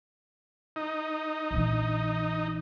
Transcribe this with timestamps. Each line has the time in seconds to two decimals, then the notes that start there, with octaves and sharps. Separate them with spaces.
0.76 D#4
1.51 A#1 E3